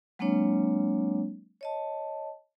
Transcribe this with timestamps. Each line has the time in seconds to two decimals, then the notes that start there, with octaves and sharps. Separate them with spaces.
0.19 F#3 G#3 A#3 C4 D4 C#5
1.61 C#5 D#5 A5